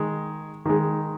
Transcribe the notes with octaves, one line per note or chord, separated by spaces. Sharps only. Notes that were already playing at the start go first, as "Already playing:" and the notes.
Already playing: D#3 G#3
D#3 G#3